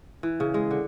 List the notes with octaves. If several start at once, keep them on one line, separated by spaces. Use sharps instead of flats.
E3
C#3
G#3
D3